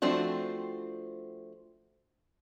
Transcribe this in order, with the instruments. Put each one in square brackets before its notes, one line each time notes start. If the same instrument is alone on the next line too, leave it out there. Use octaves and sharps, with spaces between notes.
[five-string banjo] F3 A3 C4 D4 F#4